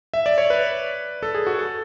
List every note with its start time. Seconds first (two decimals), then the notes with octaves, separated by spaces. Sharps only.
0.14 E5
0.26 D5
0.38 C#5
0.50 B4
1.23 A4
1.35 G#4
1.47 F#4
1.59 A4